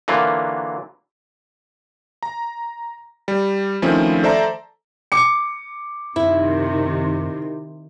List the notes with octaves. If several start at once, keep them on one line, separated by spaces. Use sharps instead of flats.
D3 E3 F#3 A#3 F4
A#5
G3
D#3 F3 A3 C4 C#4 E4
A4 C5 D5 E5 A5 A#5
D6 C#7
F#2 C3 D#3 E4